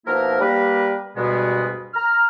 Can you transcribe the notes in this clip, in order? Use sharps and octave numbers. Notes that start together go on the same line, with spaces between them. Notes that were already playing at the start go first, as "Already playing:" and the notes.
B2 F3 A#3 D#4 E4 A#4
G3 A#3 A#4 B4
D2 G2 B2 G3 G#3 B3
A#5 F6